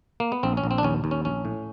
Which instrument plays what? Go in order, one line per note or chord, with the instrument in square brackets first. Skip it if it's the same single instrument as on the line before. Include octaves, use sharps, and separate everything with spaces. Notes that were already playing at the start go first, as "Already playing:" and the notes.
[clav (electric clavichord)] A#3
B3
A#1 C4
C#4
A#1
C4
D4
D#2 C#4
D#2
C#4
A#1 C#4
A2